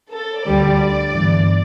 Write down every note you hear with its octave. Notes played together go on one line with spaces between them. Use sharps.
A4
D2 D3 G3 D5
G1 G2 E3